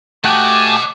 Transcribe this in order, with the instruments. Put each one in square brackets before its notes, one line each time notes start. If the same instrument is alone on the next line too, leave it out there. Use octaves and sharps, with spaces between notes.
[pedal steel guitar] A3 F#4 G4 [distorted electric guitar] D#5 F#5 [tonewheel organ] G#5 A5 [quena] D6